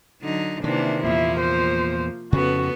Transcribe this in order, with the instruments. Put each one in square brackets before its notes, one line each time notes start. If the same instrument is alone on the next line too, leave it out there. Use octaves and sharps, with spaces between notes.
[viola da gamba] D3 F#3 D#4
[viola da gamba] C3 E3 A#3 [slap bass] D#3 [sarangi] D4
[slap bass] E2 A#2 [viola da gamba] F3 A#3 [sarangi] E4
[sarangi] C5
[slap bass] F2 C#3 C#4 [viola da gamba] B3 A4 [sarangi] F#4